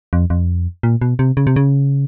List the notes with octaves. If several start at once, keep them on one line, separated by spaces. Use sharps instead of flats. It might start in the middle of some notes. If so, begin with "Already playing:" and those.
F2
F2
A#2
B2
C3
C#3
C3
C#3